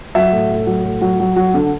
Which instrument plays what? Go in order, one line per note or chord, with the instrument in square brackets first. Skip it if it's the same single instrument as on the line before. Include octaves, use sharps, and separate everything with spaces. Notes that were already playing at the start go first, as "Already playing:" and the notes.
[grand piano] F#3 E5
A2
A2
F#3
A2
F#3
F#3
F#3
D3